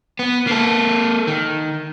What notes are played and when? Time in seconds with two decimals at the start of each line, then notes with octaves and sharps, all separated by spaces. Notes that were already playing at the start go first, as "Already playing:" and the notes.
0.19 B3
0.47 A#3 A4
1.27 D#3